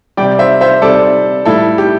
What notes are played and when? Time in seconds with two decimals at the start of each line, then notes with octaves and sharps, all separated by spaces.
0.17 C3 G3 D5 G5
0.39 C5 E5
0.61 C5 E5
0.81 C3 G3 A4 D5
1.45 A2 G3 E4 A4
1.78 G4